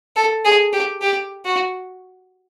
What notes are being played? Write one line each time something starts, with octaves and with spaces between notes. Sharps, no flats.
A4
G#4
G4
G4
F#4